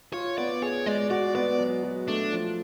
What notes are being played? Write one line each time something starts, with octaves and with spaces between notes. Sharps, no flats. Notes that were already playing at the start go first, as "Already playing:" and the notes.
F4 C#5
B3 D5
G#4 C#5
G#3 D5
F#4 D5
B3 D5
F#3
F#3
A3 D4
F3